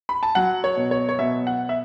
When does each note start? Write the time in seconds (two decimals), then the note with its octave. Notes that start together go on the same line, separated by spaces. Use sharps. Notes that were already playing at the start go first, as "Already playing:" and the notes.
0.09 B5
0.23 A5
0.35 F#3 F#5
0.64 C#5
0.76 B2
0.91 C#5
1.09 C#5
1.19 B2 E5
1.47 F#5
1.69 E5